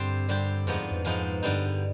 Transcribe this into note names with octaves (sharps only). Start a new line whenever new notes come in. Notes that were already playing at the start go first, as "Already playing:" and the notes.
Already playing: G2 D3 G3 C4 G4 C5
D3 G3 C4 G4 C5
F2 G#2 F3 B3 D#4
F2
G#2 F3 B3 D#4
G2 D3 G3 B3 D#4